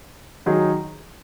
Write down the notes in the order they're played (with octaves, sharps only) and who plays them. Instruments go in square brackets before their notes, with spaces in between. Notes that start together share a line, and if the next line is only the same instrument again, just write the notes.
[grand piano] D#3 F#3 D#4 G#4